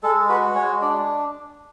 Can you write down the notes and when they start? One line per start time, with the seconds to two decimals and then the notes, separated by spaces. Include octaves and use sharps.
0.03 G#3 A4
0.29 F#4 B4
0.55 G#3 C#5
0.82 D4 D5